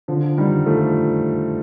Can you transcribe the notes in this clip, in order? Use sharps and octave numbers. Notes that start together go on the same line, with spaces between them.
D3 F3
D#3 G3
F3 A3